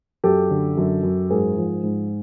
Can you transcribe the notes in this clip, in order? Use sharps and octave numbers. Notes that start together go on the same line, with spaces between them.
F#2 G4 A4
D3
F#2
F#2
G#2 G#4 A#4
F3
G#2